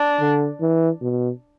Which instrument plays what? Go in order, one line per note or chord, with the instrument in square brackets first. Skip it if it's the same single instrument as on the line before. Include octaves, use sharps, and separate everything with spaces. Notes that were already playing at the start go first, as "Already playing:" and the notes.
Already playing: [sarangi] D4
[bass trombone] D3
E3
B2